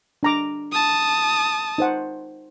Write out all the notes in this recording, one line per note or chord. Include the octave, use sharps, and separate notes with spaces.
D4 A#5 D6
A5 D#6
D#4 C5 F#5